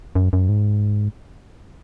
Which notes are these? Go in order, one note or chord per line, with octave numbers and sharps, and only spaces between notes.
F#2
F#2
G#2